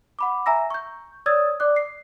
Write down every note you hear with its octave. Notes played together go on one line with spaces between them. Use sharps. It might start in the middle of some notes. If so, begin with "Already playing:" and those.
F#5 B5 D6
E5 G#5 A#5 E6 A#6
C#6 G6
C#5 D5 D#6 E6 G#6 A6
D5 D6 F#6
C7